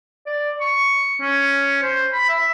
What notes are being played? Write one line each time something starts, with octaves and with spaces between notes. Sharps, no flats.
D5
C#6
C#4
C5
B5
E5